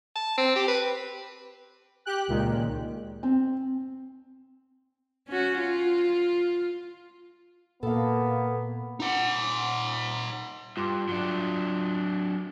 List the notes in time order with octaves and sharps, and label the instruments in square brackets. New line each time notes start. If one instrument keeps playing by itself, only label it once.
[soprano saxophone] A5
C4
G4
B4
[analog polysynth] G4 G5 F#6
C#2 A#2 D#3 G#3
[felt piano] C4
[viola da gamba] C#4 F#4
F4
[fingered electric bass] A#2 [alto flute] A#3 [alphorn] B3 [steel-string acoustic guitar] A4 F5
[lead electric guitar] D#4 F#5
[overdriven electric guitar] G2 [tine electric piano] F4 C6 D6
[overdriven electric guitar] F#3 D4